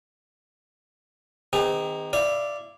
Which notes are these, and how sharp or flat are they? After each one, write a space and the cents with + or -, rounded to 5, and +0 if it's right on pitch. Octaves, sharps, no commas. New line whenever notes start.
D#3 +0 C4 -40 G#4 -45
E4 +0 D5 +0 F5 -25